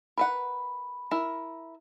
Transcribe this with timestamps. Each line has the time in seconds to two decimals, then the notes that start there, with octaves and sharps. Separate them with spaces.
0.18 A#4 B4 F#5 B5
1.11 E4 A#4